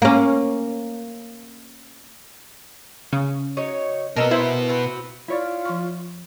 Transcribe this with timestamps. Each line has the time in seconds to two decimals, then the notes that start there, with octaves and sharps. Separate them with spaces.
0.02 A#3 C#4
3.13 C#3 C#4
3.57 F#3 D#4 C#5
4.16 B2 B3 C#4 A#4 D#5 A5 E6
4.31 A#2 E4 C5
4.69 C4 F#4 B4
5.28 E4 F4 C#5 D5
5.65 F3 C6 C#6